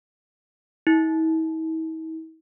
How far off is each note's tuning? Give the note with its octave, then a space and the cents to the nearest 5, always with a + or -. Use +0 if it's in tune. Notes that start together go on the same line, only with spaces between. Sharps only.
E4 -45